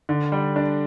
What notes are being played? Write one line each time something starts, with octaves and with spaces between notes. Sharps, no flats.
D3
G3
D4